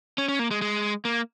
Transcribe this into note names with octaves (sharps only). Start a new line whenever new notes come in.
C#4
C#4
A#3
G#3
G#3
A#3